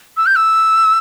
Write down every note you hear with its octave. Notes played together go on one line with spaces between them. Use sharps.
E6
G6
E6